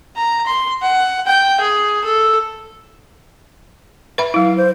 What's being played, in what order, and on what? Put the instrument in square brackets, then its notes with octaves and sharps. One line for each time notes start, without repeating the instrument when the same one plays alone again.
[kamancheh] A#5
C6
F#5
G5
G#4
A4
[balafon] B4 E5 B5
[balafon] F#3 E4 [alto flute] F5
[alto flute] C5